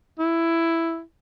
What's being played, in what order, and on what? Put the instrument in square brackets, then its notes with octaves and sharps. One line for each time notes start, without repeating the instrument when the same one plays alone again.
[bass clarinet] E4